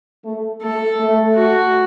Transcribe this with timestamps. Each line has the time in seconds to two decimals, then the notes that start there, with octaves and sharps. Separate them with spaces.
0.25 A3
0.62 A3 A4
0.98 A3
1.34 F#4